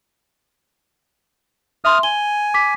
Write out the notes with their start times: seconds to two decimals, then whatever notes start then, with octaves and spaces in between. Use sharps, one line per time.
1.85 E5 C6 D#6 F6
2.03 G#5 G7
2.54 D6 B6